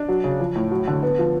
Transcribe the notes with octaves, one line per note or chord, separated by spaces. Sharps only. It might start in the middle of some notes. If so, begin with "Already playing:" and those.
Already playing: D4
F#3
C#3
F3
A2
F#3
D3
B3
F3